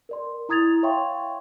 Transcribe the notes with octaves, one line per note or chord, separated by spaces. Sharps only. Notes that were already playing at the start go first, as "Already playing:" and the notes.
A#4 D5 C6
E4 A#5 D#6 G#6 A6 F7
C#5 E5 F5 G5 C6 C#6